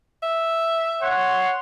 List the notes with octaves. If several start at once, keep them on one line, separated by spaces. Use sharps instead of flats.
E5
C#5 F#5 C6